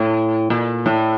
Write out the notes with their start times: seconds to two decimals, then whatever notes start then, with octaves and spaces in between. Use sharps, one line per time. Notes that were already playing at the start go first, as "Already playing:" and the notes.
Already playing: A2
0.50 A#2
0.86 A2